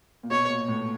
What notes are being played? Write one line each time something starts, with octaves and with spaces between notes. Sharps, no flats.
A#2
B2 C#5
A#2
A2